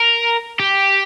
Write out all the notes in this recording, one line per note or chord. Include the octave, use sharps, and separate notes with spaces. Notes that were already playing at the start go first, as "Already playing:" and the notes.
Already playing: A#4
G4